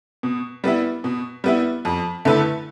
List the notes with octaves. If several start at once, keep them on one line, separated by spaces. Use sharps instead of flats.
B2
G3 B3 E4
B2
G3 B3 E4
F2
D3 A3 E4 B4